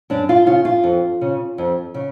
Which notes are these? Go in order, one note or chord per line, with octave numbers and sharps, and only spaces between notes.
F#2 D4
F4
C#3 F4
F4
F2
C#3
F2
C#3